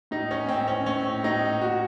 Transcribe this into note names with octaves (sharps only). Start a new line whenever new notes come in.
A2 D#4
C#4
A2 C4
C#4
A2 C#4
A2 D#4
A#2 F#4